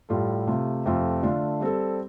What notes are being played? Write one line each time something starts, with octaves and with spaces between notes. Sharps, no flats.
A2 G3 F4 A4
C3 A3 F4
F2 C3 A3 C4 F4
D3 A3 D4 F4
G3 C4 A4